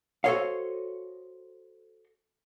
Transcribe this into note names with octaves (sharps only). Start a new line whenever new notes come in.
F#4 A4 C5 C#5 D#5 F5